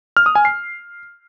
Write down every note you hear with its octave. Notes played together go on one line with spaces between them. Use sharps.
F6
D#6
G#5
C7